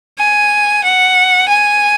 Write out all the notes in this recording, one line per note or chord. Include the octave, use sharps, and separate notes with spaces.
G#5
F#5
G#5